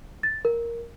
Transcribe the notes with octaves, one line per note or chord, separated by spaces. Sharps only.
A6
A#4